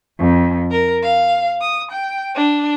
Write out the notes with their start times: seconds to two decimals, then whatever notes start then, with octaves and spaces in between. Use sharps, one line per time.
0.19 F2
0.71 A#4
1.04 F5
1.62 D#6
1.92 G5
2.36 D4